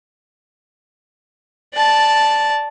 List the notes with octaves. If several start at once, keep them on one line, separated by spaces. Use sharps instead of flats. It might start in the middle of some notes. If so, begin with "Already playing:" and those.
D5 A5